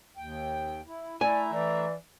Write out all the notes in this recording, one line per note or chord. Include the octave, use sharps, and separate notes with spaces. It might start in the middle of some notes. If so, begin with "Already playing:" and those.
D#2 G5
E4
A3 E4 D5 E5 G#5 A#5
E3 D5